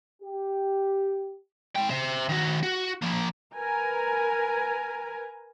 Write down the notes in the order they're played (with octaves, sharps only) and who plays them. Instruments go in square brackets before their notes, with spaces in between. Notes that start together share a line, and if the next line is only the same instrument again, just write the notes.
[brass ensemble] G4
[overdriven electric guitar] G#3 G5
C5 E5
D#3 F#4
F#4
F3 A#3
[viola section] A#4 B4 G#5 A#5